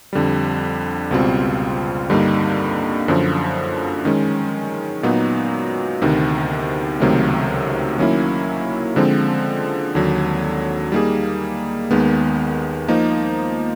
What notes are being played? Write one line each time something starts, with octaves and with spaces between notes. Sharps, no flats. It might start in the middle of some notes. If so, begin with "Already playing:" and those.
F2 D3 G3
C#2 B2 G3 C4 F4
G2 D3 G3 A#3 D#4
F#2 D3 F3
D#3 G#3 C#4
A#2 F#3 B3 D#4 F#4
D2 C3 D#3
C#2 C3 D#3 F#3 A3
D#3 F#3 A#3 C#4 E4
D3 F3 G#3 C4
D#2 D3 F#3
G3 A#3 D#4 G#4
D#2 D#3 G#3 B3
F3 A#3 D#4